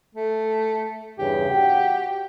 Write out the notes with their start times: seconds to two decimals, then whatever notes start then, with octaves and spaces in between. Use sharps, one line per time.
0.15 A3
1.19 E2 G2 C#3 G4
1.50 F#4 F#5 G5